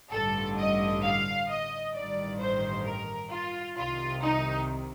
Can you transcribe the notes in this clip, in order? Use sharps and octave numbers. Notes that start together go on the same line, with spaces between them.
A1 G2 D3 A4
D#5
F5
D#5
A1 G2 D#3 D5
C5
A#4
F4
C2 C3 D#3 F4
D#4